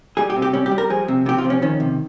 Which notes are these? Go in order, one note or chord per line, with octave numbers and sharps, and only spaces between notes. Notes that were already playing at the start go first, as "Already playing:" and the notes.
G3 G#4
G4
C3
G4
G3 C#4
G4
G3
A#4
F3 G#4
C3
C3 G4
F4
F3
C#4
D#3 C#4
C3